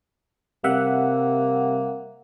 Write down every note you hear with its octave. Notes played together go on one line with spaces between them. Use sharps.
C3 G3 A#3 E5 F#5